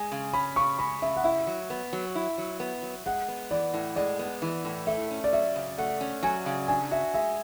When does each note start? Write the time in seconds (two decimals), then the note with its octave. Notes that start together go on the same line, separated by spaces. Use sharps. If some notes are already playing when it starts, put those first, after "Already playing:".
Already playing: G#3 G#5
0.12 C#3
0.33 C#4 B5
0.56 C#3 C#6
0.79 G#3 B5
1.02 C#3 E5
1.16 F#5
1.24 E4 E5
1.47 F#3
1.70 B3
1.93 F#3
2.15 E4
2.38 F#3
2.60 B3
2.82 F#3
3.06 G#3 F#5
3.28 B3
3.51 E3 D5
3.74 A2
3.96 G#3 D5
4.19 B3
4.42 E3
4.65 A2
4.87 A3 E5
5.10 C#4
5.24 D5
5.33 F#3 E5
5.56 C#3
5.78 A3 F#5
6.01 C#4
6.23 F#3 G#5
6.46 C#3
6.68 D4 G#5
6.91 F#4 E5
7.14 G#3 E5